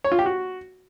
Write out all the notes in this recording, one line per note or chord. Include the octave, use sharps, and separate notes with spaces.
C#5
F4
G4
F#4